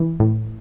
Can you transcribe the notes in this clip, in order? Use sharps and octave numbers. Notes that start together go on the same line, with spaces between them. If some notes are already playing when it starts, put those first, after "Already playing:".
Already playing: E3
A2